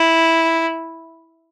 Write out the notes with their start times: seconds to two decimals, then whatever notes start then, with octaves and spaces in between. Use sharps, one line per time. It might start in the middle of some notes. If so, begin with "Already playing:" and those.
Already playing: E4